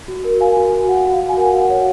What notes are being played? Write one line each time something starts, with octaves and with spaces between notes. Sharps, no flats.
F#4
A#4
A#4 F5 G#5
F#4
F#4
F#4 F#5
F#4
F5
F#4
G#5
A#4 F#5
F#4 F5
F#5
C#5